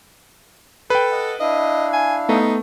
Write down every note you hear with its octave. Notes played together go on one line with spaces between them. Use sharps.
A4 B4 G5
D#5 F#5
D4 E4 D#5 F5
G#5
A3 B3 D#4